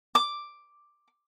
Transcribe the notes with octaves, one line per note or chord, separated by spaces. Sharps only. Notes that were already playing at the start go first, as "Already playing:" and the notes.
D6